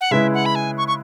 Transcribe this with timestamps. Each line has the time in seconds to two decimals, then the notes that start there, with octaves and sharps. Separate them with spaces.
0.01 F#5
0.11 C#3 G#3 E4 B4 E5
0.34 F#5
0.46 B5
0.55 G#5
0.77 C#6
0.88 C#6